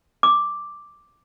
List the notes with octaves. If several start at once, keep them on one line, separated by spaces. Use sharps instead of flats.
D6